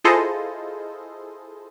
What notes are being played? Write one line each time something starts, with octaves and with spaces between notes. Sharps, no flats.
E4 F4 G#4 A4 C5 D#5